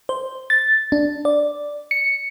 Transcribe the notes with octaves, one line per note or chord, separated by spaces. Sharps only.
C5
A6
D4
D5
C#7